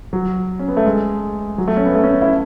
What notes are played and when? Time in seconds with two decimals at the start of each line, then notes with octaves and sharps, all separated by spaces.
0.13 F#3
0.59 C#4
0.68 B3
0.77 A3
0.86 G#3
1.58 F#3
1.68 A3
1.77 C#4
1.86 B3
1.95 A3
2.04 C#4
2.22 E4